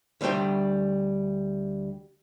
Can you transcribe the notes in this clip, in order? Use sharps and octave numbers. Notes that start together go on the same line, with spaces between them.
D2 G3 A3 C5 G5